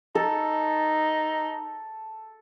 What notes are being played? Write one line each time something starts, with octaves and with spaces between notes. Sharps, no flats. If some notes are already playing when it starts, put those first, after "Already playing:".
D#4 A4